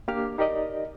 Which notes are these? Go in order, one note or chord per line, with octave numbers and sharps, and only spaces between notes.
A#3 D4 G4 D6 F6
D#4 G4 A#4 D5 D#5